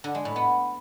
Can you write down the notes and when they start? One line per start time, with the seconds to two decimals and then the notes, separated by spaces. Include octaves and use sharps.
0.04 D3
0.15 G#3
0.25 A2
0.36 B3